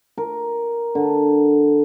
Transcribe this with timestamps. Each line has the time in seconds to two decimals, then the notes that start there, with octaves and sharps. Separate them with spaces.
0.17 A#4
0.95 D3